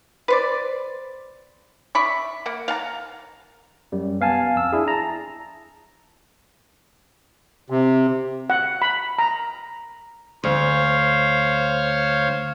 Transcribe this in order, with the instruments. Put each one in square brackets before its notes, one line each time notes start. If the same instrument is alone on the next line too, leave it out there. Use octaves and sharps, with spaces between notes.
[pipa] B4 C5 D5
D5 E5 B5 C#6
A#3 F#5
F5 F#5 A5 A#5
[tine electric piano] F#2 G3
C2 B3 F5 G#5 A5
F2 E6
D4 E4 G#4
A5 A#5
[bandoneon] C3
[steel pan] F#5
B5
A#5
[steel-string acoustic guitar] D2 [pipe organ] C5 C#5 F5